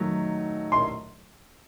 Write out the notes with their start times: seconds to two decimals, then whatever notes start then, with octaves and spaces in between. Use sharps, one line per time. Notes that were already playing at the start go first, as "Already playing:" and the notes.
Already playing: D#3 F#3 A3
0.72 C6